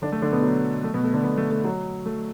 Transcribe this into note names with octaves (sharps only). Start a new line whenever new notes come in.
D3 D4
A3
D3 D4
B2 B3
F#3
A3
B2 B3
A3
D3 D4
B2 B3
A3
A3
F#3
A3